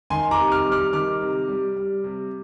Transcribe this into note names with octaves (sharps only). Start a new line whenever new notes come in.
D#3 G#5 C6
A#5 D6
C3
D6 F6
G3
D6 F6
D#3 D6 F6
C3
G3
G3
C3